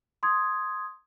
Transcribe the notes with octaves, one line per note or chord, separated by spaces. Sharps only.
C6 D#6 G#6